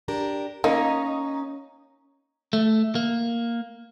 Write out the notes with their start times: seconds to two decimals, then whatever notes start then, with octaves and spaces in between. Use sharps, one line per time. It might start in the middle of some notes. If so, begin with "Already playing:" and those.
0.08 D4 G4 A#4
0.64 A#3 C#4 D#4
2.53 A3
2.95 A#3